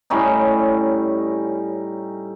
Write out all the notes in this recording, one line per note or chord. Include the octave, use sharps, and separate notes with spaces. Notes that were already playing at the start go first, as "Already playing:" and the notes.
A2 G3 C#4 D#4